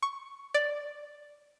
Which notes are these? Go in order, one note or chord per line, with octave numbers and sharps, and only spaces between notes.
C#6
D5